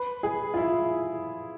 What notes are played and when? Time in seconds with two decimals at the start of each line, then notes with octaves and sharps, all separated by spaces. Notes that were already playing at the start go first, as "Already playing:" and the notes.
Already playing: B4
0.23 G#4
0.54 F4
0.57 E4